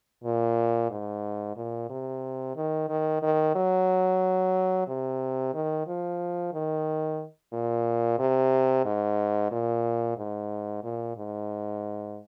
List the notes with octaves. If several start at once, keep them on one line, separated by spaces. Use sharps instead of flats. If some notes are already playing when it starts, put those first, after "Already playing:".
A#2
G#2
A#2
C3
D#3
D#3
D#3
F#3
C3
D#3
F3
D#3
A#2
C3
G#2
A#2
G#2
A#2
G#2